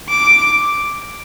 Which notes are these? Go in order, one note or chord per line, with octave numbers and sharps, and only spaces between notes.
D6